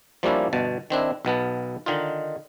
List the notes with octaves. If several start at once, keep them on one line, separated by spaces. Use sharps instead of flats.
F3 G3 A#3 C#4 D4 E4
G1 B2 A5
D#3 C4 D4 E4
B1 B2 B3 A5
D3 D#3 D#4 F4